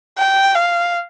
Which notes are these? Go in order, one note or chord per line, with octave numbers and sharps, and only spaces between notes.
G5
F5